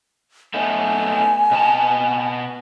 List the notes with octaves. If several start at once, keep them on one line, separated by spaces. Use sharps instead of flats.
A3 B3 D#4 G#5
B2 B3 A5